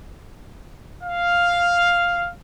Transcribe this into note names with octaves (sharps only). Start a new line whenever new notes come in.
F5